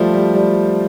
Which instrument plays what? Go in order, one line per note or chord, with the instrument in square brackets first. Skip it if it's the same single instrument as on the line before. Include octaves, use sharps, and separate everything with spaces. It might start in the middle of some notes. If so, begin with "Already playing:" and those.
Already playing: [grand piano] F3 G3 A3
G3
G3